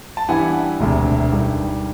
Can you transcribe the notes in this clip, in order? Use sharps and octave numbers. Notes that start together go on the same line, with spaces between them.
A5
G2 E3 G3 B3 E4 F#5 G#5
E1 D2 C3
G2 D#3 G3